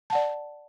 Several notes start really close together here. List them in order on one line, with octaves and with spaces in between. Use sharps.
A5 F#5 D5